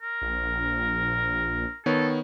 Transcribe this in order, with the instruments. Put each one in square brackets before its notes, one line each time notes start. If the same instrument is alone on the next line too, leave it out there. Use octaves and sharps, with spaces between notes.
[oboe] A#4
[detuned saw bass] A#1
[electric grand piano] D#3 B3 C#5 [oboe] A4